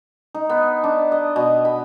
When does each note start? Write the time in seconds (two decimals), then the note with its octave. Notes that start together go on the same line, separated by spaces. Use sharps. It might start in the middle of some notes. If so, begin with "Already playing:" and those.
0.35 D#4
0.50 B3
0.84 D4
1.12 D#5
1.36 B2
1.65 B5